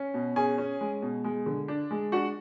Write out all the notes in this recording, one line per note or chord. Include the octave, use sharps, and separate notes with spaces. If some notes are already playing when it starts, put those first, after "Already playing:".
Already playing: C#4
B2
C#4 G#4 G#5
C#4
G#3
B2
G#3
D3
D4
G#3
D4 F#4 F#5